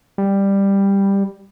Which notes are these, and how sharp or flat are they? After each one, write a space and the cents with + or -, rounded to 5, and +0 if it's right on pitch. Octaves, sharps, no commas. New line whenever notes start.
G3 +10